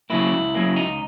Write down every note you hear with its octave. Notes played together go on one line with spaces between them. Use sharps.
C#3 F#3 A#3 E4
C#2
C#3 F#3 A#3
C#2 D#4